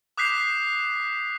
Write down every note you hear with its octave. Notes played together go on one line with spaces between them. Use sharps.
D6 D#6 F#6 G6 B6 C7